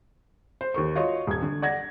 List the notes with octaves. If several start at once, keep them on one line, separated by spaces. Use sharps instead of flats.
C5
D#2 A#4 C#6
F4 F#4 C#5 D#5 C#6
D#1 G#6
D3
D5 F#5 G#6 A#6